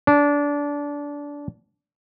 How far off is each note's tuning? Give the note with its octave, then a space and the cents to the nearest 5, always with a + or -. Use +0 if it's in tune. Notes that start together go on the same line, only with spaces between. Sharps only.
D4 -20